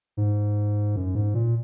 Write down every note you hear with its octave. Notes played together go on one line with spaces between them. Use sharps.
G#2
F#2
G#2
A#2